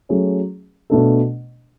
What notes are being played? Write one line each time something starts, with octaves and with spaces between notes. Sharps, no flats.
F#3 A3 C#4 G#4
B2 A3 D4 A4